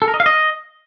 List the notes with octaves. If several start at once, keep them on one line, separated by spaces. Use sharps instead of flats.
A4
A#4
D#5
F5
D#5